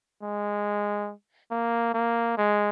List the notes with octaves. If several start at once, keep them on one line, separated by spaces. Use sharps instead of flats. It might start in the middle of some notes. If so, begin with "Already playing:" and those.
G#3
A#3
A#3
G#3